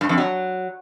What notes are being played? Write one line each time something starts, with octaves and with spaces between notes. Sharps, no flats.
G2
F2
F#3